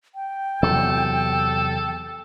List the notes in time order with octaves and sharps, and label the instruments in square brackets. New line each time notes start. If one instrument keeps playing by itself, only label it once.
[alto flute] G5
[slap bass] E2 C3 F#3 [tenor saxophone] A4